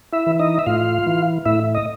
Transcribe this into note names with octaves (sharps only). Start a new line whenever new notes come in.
E4 E5
E3
D#4 D#5
E5
A2 F4 F5
E3
A2 E4 E5
D#5